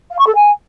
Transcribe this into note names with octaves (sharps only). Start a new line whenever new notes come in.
F5
C#6
A4
G#5